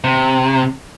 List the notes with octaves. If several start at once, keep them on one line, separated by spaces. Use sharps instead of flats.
C3